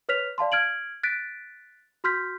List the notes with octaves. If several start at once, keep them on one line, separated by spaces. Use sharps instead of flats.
B4 C#5 F6 B6 F7
D5 F5 A5 C6
F6 G#6 D7 F#7
F#6 A6 B6 D7
F#4 C6 F6 G6 B6